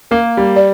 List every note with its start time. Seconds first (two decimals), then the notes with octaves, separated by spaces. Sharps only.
0.11 A#3 A#4
0.37 G3
0.56 D5